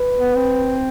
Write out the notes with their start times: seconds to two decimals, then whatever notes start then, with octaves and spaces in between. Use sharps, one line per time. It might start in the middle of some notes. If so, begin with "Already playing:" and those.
Already playing: B4
0.18 B3
0.35 C4